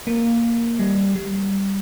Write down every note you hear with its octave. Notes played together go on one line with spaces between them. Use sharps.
A#3
G3
G3